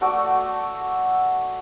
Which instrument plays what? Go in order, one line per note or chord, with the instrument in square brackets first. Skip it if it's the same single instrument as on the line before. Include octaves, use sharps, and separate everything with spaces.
[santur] A3 F#4 D5